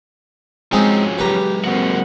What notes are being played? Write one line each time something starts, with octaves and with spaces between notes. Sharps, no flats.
F3 G#3 C4 C#4 D#4 F#4 G#4
F#3 G#3 G4 B4 A#5
A#3 C4 F#4 F#5